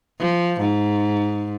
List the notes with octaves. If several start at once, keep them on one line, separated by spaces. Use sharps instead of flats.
F3
G#2